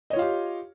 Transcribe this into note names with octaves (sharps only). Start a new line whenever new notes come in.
F4 G4 C#5 D#5 F5